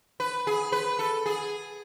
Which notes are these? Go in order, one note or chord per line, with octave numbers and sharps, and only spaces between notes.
B4
G#4
B4
A4
G#4